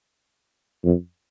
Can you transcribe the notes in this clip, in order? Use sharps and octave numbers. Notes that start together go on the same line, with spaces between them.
F2